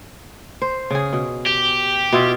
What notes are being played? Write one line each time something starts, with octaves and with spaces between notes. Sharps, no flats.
C5
C#3 G#4
B2
G4
B2 E4 F4